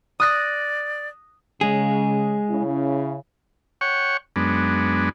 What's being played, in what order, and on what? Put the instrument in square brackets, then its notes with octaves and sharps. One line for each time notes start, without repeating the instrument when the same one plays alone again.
[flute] D5 [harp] D#6 F#6 A#6
[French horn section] C#3 [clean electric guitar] G#3 G#4
[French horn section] C#3 E4
[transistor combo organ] C#5 F#5 G5 C#6
F#2 G#3 B3 D4